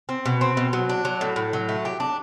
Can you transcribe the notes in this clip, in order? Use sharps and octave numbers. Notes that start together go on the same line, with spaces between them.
C4
B2
C4
B2
F#3
D4
F#3
A2
A2
F#3
A3
G4
D4